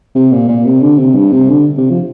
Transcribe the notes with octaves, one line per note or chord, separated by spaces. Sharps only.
C3
A#2
A#2
C3
D3
C3
G2
C3
D3
C3
F3